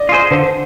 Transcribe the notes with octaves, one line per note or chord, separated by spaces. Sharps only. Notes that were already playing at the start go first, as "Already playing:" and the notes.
Already playing: D5 D#5
F4 G#4 C5
D3 C5